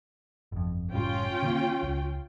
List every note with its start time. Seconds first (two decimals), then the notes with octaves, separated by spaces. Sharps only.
0.52 G1 F2
0.93 F#1 A2 G3 C#4 F4 G5
1.43 D3 D#3 A#3
1.83 C#2